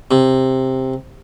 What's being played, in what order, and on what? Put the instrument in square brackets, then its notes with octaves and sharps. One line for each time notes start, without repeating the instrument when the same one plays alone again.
[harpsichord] C3